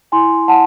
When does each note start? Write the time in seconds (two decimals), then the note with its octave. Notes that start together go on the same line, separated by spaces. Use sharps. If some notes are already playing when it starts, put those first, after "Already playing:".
0.12 E4 G#5 C6
0.48 E4 F#5 A5